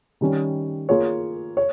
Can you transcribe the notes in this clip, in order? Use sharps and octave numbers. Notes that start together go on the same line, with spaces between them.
D#3 G3 C#4
A#3 F4 G#4 C#5
C#5